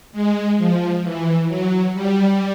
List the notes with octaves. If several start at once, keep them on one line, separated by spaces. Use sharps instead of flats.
G#3
F3
E3
F#3
G3